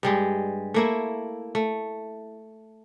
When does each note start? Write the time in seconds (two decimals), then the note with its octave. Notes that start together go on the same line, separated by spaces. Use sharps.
0.03 G2 G3 G#3
0.74 A3 A#3 E4
1.55 A3